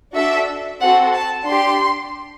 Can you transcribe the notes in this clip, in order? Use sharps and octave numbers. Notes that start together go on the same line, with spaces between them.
D4 F#4 A4 E5
C4 F#4 A4 F#5
A5
D4 G4 C6